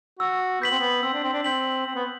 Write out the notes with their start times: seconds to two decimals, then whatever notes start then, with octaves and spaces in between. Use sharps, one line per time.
0.19 F#4 E6
0.61 B3 G6 B6 F#7
0.71 C4
0.79 B3
1.03 C4 E6
1.13 D4
1.24 C4
1.33 D4
1.44 C4 G6 B6 F#7
1.86 C4 E6
1.95 B3